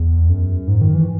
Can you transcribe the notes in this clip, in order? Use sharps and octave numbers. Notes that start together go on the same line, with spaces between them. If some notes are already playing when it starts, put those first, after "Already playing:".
Already playing: E2
F#2
G#2
D#3
E3